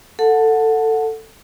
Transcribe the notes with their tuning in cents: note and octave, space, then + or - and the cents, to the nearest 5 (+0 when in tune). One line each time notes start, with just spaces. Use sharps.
A4 +15 F#5 -15 A5 +0